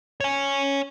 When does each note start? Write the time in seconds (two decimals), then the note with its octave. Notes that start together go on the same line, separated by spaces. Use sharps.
0.21 C#5 G#5